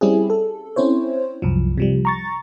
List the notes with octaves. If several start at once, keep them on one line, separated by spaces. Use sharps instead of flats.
G3 C4 C#4 E4 G4 G#4
A4
C4 C#4 E4 C5 C#5
C2 F#2 F3
C3 F3 G3
A#5 C#6 A6